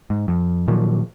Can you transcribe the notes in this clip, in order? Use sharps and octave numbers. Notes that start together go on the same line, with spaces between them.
G#2
F2
A#2 D#3 F3 F#3